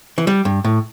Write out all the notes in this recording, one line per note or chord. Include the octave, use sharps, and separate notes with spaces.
E3
G3
G2
A2